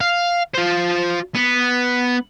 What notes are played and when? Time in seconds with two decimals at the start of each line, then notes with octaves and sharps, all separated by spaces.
0.01 F5
0.55 F4 C5
1.35 B3